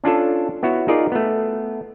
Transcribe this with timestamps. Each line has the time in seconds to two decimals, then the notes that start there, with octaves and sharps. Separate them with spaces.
0.04 C#4 D4 F4 A4
0.63 B3 E4 F#4 C#5
0.88 D#4 F4 G#4 A#4 D5
1.12 A3 B3